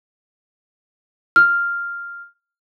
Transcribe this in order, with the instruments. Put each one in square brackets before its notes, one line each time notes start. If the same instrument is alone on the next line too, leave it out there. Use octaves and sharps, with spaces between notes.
[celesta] F6